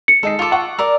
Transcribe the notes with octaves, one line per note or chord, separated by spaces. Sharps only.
C#7
G#3 D#4 A4 C7
F4 A4 A5 D6
F#5 C#6
A#4 D5 E6